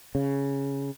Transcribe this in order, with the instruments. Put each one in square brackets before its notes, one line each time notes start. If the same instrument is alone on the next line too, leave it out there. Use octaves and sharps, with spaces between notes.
[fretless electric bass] C#3